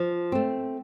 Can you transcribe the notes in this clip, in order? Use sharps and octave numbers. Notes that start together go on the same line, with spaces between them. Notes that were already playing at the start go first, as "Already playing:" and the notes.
Already playing: F3
A3 C4